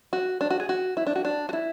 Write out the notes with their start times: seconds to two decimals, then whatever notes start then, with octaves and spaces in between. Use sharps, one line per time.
0.13 F#4
0.41 D4
0.50 F#4
0.60 G#4
0.69 F#4
0.97 E4
1.07 D4
1.16 F#4
1.25 D4
1.49 F#4
1.53 E4